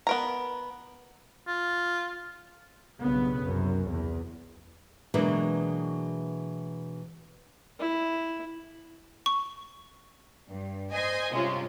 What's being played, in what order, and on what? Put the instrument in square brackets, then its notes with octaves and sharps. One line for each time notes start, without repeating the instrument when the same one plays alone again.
[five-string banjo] B3 A#4 A#5
[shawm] F4
[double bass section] B1 G2 C#3 B3
C2 F#2
E2
[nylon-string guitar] B2 E3 F#3 G#3 A#3 D4
[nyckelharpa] E4
[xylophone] C#6
[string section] G2
C5 D#5 G#5
G2 C3 G#3 C#4 F4